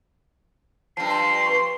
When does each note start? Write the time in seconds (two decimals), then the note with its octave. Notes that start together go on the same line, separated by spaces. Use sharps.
0.97 G2 F3 A5 C7
1.10 C6
1.46 B4 C#6